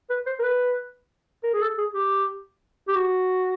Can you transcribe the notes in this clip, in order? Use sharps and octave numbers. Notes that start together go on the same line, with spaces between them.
B4
C5
A#4
B4
A#4
G#4
A4
G#4
G4
G4
F#4